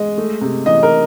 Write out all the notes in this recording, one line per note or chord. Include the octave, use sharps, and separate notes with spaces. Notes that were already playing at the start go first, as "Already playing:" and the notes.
Already playing: G#3 D#5
A3
C3
E3 D#5
A#4